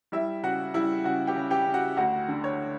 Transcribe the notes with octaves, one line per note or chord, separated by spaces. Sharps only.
G3 E4 E5
C#3 F#4 F#5
G3 E4 E5
C#3 F#4 F#5
G4 G5
C#3
G4 G5
C#3
F#4 F#5
D2 F#4 F#5
D3
C#5